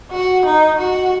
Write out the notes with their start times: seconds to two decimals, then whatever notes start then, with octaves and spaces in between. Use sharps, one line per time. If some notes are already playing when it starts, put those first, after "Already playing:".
0.12 F#4
0.45 D#4
0.78 F#4